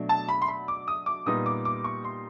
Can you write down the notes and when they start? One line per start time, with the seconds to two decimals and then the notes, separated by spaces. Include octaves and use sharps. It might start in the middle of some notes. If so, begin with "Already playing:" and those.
Already playing: B2 F#3 A3 D4
0.09 A5
0.29 B5
0.42 C6
0.48 B5
0.68 D6
0.88 D#6
1.06 D6
1.26 A#2 G3 B3 D#4 D#6
1.46 D6
1.65 D6
1.84 C#6
2.04 C6